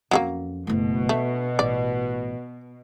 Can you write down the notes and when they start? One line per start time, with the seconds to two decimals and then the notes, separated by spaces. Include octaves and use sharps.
0.11 F2 F#3 G#3 A#3 C#4
0.67 F#1 B2 A3
1.09 A3 D4
1.59 A1 D5